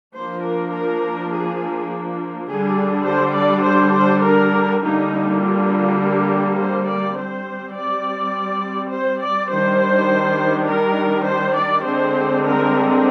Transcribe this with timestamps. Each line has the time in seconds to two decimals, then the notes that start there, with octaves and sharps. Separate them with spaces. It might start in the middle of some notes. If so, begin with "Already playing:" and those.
0.15 F3 A#3 D4 C5
0.44 A#4
0.73 A#4
1.32 G#4
2.49 D3 G3 D4 G#4
3.07 C5
3.36 D5
3.65 C5
3.95 C5
4.24 A#4
4.82 D3 G3 A#3 D#4
5.42 F4
5.99 G4
6.58 C5
6.88 D5
7.17 G3 C4 C5
7.75 D5
8.92 C5
9.21 D5
9.50 D#3 G3 D4 C5
10.67 A#4
11.26 C5
11.55 D5
11.84 D3 G#3 C4 C5
12.43 A#4